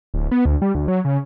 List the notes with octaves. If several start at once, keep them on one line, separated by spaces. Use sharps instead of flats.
D1
B3
D2
G3
D2
F#3
C#3